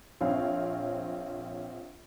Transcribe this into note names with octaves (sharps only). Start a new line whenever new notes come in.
A#1 C4 C#5 F5